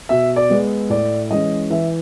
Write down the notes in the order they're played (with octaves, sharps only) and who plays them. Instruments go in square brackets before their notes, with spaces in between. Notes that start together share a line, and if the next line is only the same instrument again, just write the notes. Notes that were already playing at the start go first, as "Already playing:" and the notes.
[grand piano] B2 E5
D5
G#3 B3
A2 D5
E3 G#3 C#4 D#5
E3 E5